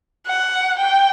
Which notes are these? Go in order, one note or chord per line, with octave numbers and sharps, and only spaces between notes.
F#5
G5